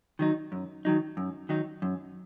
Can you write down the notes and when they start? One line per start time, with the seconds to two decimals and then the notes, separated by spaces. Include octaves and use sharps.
0.19 D#3 F#3 D#4
0.52 F#2
0.85 D#3 F#3 D#4
1.17 F#2
1.49 D#3 F#3 D#4
1.82 F#2